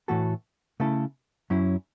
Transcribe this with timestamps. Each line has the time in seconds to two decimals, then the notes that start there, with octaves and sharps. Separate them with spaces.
0.08 A2 E3 A3 F#4 A4
0.80 C#3 A3 E4 A4
1.50 F#2 F#3 C#4 E4